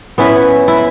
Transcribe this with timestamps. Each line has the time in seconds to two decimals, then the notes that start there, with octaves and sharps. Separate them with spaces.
0.18 B3 C#4 E4 B4
0.68 E4